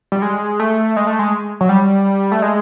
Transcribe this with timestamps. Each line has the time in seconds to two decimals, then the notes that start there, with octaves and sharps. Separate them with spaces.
0.12 G3
0.22 G#3
0.60 A3
0.96 G#3
1.07 A3
1.19 G#3
1.61 F#3
1.69 G3
2.32 A3
2.42 G#3